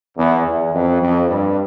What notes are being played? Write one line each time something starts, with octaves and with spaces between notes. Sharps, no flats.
E2
E2
F2
F2
G2